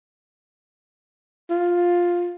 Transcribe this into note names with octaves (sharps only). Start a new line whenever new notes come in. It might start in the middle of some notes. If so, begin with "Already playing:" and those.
F4